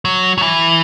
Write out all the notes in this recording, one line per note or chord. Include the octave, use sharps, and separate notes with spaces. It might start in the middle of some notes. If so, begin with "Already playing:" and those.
F#3
F#3
E3